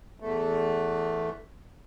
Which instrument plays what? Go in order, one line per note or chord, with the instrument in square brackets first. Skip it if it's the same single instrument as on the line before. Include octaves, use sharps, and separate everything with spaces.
[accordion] E2 A3